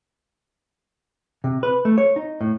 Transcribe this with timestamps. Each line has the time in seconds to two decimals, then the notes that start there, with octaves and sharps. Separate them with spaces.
1.44 C3
1.63 B4
1.85 A3
1.98 C#5
2.16 D#4
2.41 A2